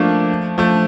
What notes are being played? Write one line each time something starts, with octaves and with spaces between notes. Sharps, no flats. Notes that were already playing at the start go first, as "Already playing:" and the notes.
Already playing: F3 A3 A#3 D4
F3 A3